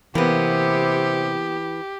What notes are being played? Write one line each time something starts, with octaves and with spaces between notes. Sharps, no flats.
C3 E3 A#3 B3 G4